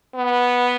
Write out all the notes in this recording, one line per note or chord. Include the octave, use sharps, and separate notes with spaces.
B3